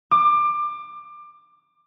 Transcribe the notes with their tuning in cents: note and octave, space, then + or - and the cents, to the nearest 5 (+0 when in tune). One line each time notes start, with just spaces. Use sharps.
D6 +25